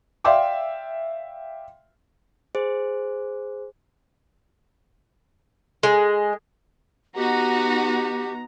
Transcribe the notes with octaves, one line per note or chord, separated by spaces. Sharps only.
D5 E5 F5 G5 C6 D6
G#4 C5
G#3
B3 D#4 F#4 G4 A#5